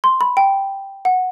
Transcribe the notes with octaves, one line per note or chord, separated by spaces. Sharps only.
C6
B5
G5
F#5